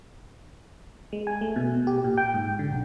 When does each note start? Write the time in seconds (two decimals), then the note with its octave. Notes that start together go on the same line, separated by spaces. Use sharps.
1.13 G#3
1.27 G#5
1.41 A3
1.56 B2
1.87 G4
2.04 A#2
2.17 G5
2.34 G#2
2.59 D3
2.71 B1